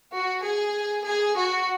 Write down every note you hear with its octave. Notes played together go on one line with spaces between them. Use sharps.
F#4
G#4
G#4
F#4